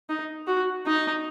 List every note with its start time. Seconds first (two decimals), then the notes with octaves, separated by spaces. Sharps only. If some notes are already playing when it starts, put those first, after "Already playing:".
0.09 D#4
0.47 F#4
0.86 D#4